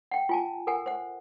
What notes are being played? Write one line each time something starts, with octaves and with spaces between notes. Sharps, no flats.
F#5 G5
F4 G#5 A5
A4 A#4 F#5 G#5
C5 F#5